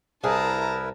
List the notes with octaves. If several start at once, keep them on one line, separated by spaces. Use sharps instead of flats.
C2 E4 G#4 A#4 B4 A5 A#5